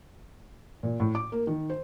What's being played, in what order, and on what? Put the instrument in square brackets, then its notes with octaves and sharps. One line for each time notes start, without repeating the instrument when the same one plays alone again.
[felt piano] A#2
A2
D6
A#3
D#3
C5